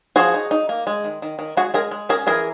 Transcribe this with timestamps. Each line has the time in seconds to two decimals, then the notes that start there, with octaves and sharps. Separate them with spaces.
0.16 F3 F#4 G#4
0.34 D#4
0.51 D#4
0.69 A#3
0.87 G#3
1.04 D#3
1.22 D#3
1.39 D#3
1.57 G#3 F#4 G#4
1.74 G#3 G#4 A#4
1.91 G#3
2.09 C#4 G#4 A#4
2.27 E3 G#4 A#4